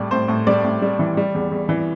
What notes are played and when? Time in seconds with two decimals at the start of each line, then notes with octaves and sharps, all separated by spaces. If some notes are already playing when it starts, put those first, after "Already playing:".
Already playing: A2 G3 D5
0.11 A2 C5
0.28 A2
0.47 G3 D5
0.64 A2
0.82 G3
0.99 E3
1.17 G3
1.35 E2
1.51 E2
1.69 E3